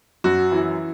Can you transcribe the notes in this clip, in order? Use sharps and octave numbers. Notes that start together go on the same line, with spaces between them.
F#2 F#4
E3